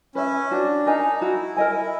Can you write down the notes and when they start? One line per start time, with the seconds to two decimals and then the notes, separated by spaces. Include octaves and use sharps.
0.15 C#4 B4 E5
0.51 D4 F#4
0.86 D#4 A#4 D#5 G#5
1.21 E4 F#4
1.57 A#4 D#5 G#5